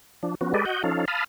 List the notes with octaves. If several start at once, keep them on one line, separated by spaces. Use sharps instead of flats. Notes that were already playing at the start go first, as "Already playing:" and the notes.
F3 D4
F3 B3 C#4 F#4
G#3 G4 A4 B4 D5 D#5
F#4 D#5 F#5 G6
F3 C#4 D#4 A4 F5
F5 A5 B5 D#6 F6